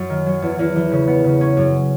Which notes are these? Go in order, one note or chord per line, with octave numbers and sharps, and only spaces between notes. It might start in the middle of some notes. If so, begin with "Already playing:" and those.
Already playing: F#2
D#3
F#3
E2
E2
E3
C#3
B3
C#3
C#4
F#2